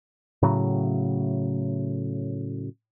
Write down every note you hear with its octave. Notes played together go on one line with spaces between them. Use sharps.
A2 C#3 F#3